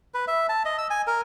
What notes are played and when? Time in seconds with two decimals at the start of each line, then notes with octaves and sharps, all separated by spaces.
0.14 B4
0.28 E5
0.49 A5
0.65 D#5
0.78 E6
0.90 G#5
1.07 A#4